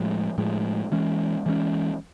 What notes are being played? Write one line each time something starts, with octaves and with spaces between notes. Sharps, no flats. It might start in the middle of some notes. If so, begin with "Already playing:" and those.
Already playing: A2 F3 G#3
A2 F3 G#3
E3 G#3 C#4
E3 G#3 C#4